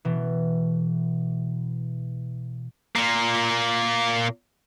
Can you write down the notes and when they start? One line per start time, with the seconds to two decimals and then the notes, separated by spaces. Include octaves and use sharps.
0.05 B2 E3
2.96 A#2 A#3